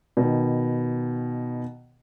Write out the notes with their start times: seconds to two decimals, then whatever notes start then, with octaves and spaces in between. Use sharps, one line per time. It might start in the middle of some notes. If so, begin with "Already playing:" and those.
0.17 B2 D#3